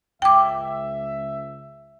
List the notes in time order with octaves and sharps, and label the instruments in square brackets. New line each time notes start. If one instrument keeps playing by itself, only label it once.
[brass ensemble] C#2 E5 [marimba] G5 D6